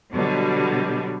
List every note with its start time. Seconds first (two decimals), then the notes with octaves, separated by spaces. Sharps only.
0.12 B2 D3 F#3 G3